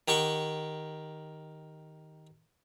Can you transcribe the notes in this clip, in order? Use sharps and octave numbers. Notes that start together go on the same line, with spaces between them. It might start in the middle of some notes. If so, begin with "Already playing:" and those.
D#3 G4 F#5 C#6